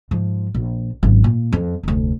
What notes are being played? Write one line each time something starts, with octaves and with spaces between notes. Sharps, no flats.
G#2 F3
A#1
G#1 F#2
A#2
F2
F1 D2